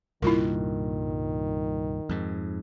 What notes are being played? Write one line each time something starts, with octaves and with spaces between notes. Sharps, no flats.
C2 G2 A#2 D#3 E4 F4 A#4
F2 G#2